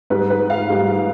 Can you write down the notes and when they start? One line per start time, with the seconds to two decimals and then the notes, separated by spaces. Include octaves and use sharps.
0.10 G#2 G3 B4
0.30 B4
0.50 F5
0.70 G#2 G3